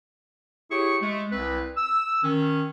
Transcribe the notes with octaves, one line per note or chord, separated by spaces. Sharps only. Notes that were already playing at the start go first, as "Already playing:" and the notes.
E4 G4 G#4 C#5 C#6
G#3 A3
C2 C4 B4
E6
D#3 C#4